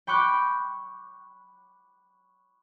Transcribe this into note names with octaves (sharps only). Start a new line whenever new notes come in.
G5 B5 C#6 D6 F#6 G6